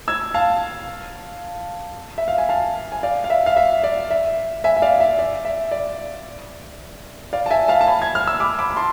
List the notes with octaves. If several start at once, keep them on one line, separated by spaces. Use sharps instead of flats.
E6 G#6
F5 A5
E5
F5
G#5
F5 A5
G#5
D5 F5
F5
E5
F5
E5
D5
E5
E5 G#5
E5
D5 F5
E5
D5
E5
D5
D5 F5
A5
E5 G#5
F5 A5
A5
G#5 B5
G#6
F6
E6
B5 D6
B5 D6
B5
A5 C6